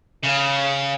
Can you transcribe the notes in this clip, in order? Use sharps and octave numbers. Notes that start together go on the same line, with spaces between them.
C#3